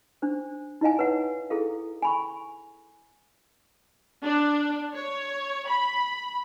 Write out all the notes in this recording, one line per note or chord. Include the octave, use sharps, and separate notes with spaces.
D4 C5
D#4 E4 D#5 F5 G#5
B4 C#5 F#5
E4 G#4 A4 F5
G#5 B5 C#6
D4
C#5
B5